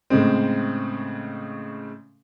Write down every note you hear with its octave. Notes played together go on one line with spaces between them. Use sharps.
A2 C#3 G#3 C4